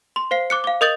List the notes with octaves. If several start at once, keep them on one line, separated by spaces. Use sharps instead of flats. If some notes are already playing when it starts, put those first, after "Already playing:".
C6
C5 F5 C7
D6 F#6 C#7
F5 D6
A#4 D#5 D#6 G6 A6 F#7